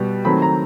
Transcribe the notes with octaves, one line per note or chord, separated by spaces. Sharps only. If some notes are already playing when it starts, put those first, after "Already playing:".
Already playing: B2 G3 B3
D#3 F#3 A3 C4 B5
A#5